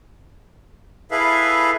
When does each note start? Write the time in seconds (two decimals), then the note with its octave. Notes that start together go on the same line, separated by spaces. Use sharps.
1.11 E4 G#4 A4 B4 E5 F5